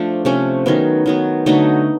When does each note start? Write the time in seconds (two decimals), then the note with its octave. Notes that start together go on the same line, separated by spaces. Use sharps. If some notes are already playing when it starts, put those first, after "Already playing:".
Already playing: F3 A3 D4
0.25 C3 F3 A3 C#4
0.66 D#3 F#3 B3
1.06 D#3 F#3 B3
1.46 D3 F#3 A3 D#4